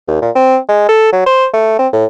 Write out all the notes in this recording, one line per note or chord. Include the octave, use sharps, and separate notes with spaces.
D#2
A#2
C4
G#3
A4
F#3
C5
A3
C4
A2